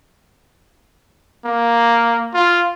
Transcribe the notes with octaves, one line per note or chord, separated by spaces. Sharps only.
A#3
F4